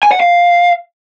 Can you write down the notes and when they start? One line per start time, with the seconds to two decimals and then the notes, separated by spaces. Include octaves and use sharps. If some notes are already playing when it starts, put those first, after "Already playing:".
0.03 G#5
0.12 F#5
0.20 F5